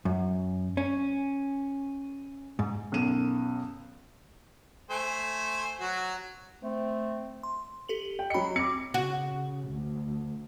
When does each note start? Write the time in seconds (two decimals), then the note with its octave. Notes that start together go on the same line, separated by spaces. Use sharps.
0.05 F#2
0.77 C#4
2.59 G#2
2.92 B1 F#2 D#7 E7
4.90 A3 C5 G#5
5.81 F#3 F#4
6.63 A3 C4
7.43 C6
7.89 G4 A4 F#7
8.19 G5
8.30 F#3 D#5 B5 C#7
8.56 C4 D6 C#7
8.94 C#3 F#4
9.70 D2